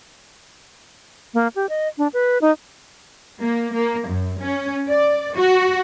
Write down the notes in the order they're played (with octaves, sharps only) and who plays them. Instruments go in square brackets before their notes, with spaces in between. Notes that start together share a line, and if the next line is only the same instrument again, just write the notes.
[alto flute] A#3
G4
D#5
D4
B4
D#4
[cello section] A#3
A#3
F#2
C#4
D5
F#4